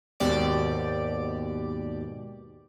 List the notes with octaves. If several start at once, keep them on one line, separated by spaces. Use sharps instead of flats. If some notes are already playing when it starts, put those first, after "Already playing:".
D#2 G#2 B2 G4 D5 D7